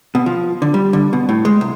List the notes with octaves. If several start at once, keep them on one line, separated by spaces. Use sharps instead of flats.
B2
F3
D3
G3
D3
B2
A2
G#3
C2